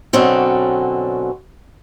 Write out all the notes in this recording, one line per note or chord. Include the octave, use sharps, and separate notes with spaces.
B2 D3 F#3 C4 C#4